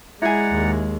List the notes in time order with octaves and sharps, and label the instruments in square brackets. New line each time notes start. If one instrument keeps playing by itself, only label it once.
[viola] G#3 [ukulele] E4 G#4 [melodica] D5 F#5 A#5
[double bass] D#2